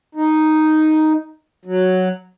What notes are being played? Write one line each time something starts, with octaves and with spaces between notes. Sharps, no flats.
D#4
F#3